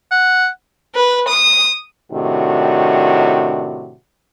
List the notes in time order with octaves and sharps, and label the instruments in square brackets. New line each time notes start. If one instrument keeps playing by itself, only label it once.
[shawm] F#5
[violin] B4
D#6
[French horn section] A2 C3 D#3 D4 F#4